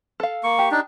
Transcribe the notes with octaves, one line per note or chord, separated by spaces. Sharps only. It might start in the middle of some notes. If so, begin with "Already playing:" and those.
A4 F5
A#3 C#6
G4
D4 D#4